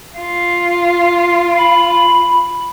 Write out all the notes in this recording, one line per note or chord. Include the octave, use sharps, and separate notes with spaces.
F4
B5